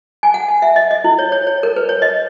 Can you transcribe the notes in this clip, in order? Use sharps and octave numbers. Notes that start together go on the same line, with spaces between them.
G#5
F#5
F#5
E5
D#5
D#5
E4
C#5
C#5
C#5
A#4
B4
C#5
D#5